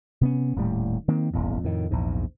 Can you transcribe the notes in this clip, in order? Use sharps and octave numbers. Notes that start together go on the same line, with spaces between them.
C3 B3 C#4
D#1 A2 G3
D#3 A#3 C4
D#1 G#1 E2
F2 A2 D#3
A#1 E2 G#2